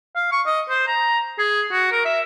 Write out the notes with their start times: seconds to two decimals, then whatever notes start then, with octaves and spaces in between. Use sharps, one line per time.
0.16 F5
0.32 C#6
0.46 D#5
0.69 C5
0.87 A#5
1.39 G#4
1.72 F#4
1.91 A#4
2.05 E5